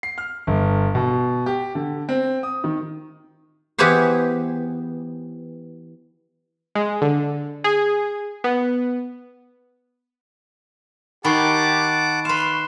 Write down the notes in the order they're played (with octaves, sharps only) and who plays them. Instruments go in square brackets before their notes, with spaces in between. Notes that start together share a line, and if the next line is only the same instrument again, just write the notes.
[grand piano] C7
F6
G1
B2
G4
D3
C4
D#6
D#3
[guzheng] E3 B3 G4 G#4 B4 C5
[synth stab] G#3
D3
G#4
B3
[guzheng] D#3 [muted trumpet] G4 [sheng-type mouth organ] F#5 A5 D6 [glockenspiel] B5 C#6 C7
[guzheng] B4 F5 [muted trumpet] C6 [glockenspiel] E7